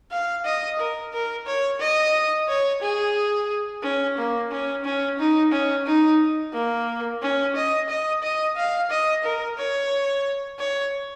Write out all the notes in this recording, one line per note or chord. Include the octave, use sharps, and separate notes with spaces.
F5
D#5
A#4
A#4
C#5
D#5
C#5
G#4
C#4
A#3
C#4
C#4
D#4
C#4
D#4
A#3
C#4
D#5
D#5
D#5
F5
D#5
A#4
C#5
C#5